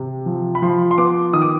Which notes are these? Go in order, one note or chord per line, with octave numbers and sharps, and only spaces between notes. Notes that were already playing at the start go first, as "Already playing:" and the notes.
Already playing: C3
F3
B5
F3 C6
C6
B3 D6
D#3 D#6
D6